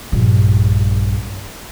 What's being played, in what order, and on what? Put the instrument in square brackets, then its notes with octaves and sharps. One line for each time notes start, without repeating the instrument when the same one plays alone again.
[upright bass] A#1 G2